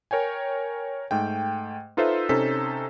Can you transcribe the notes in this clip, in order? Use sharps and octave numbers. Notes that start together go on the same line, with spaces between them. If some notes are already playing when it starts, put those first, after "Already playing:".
A#4 C#5 G5 G#5
G#2 A3 G5
D#4 F4 A4 B4 C5 E5
C3 C#4 D#4 A4 C5 B6